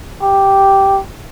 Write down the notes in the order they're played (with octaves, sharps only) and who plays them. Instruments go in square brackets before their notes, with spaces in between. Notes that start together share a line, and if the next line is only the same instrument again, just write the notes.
[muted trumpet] G4